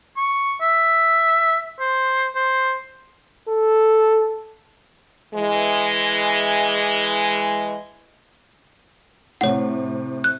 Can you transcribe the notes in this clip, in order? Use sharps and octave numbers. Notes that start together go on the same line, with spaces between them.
C#6
E5
C5
C5
A4
E3 G#3
A2 C3 C#5 F#5
F#6